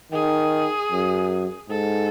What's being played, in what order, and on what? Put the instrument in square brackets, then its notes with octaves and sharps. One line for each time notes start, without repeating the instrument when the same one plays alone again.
[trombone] D#3 [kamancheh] G#4
[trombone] F#2
[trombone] G#2 [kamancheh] A4